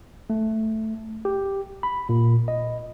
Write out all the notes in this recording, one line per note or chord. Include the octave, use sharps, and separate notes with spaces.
A3
G4
B5
A#2
D#5